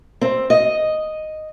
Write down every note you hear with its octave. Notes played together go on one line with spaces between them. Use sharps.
C4
D#5